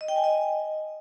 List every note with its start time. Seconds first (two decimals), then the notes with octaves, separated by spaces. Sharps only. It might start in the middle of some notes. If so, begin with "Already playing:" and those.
0.01 D#5
0.08 G5
0.16 G#5
0.24 D#5